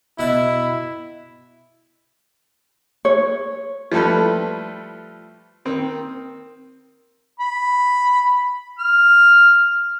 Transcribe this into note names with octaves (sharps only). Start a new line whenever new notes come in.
B2 E4 F#5 A5
C#5
F3 G3 A3 A4 B4
D#3 C4
B5
F6